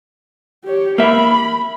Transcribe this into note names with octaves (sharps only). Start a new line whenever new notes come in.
G4 C#5
A#3 E5 B5